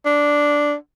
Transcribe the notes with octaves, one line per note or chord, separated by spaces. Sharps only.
D4